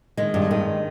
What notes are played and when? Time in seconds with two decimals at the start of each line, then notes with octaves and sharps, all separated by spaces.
0.17 D#3 G#3
0.34 G2
0.51 D#3